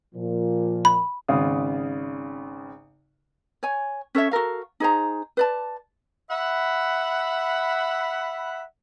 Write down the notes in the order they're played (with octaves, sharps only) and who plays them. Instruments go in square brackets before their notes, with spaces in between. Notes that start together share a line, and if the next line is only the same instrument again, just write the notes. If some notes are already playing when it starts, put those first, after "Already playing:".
[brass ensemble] A#2 F3
[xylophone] B5
[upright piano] G#1 C#3 F5 D#6
[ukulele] C#5 G#5
C#4 A4 C#5 E5
F#4 A4 A#4 F5
D#4 G#4 C5 A#5
B4 D5 A5
[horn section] E5 F#5 B5